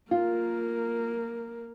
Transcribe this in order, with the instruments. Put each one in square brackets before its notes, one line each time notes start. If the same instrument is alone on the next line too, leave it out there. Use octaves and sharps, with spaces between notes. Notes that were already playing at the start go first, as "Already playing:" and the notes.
[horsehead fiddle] A#3 A#4 [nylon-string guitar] F4